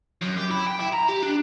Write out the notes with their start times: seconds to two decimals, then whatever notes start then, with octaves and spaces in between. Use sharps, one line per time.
0.21 F#2
0.37 G4
0.51 E4
0.67 G5
0.80 E4
0.93 A#5
1.09 G4
1.22 D4